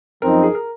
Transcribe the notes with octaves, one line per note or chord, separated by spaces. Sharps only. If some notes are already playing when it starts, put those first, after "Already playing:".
F#2 F3 C4 D#4 A#4
G#4
A#4